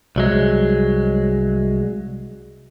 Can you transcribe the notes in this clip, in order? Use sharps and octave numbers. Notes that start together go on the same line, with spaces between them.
C2 F#3 G#3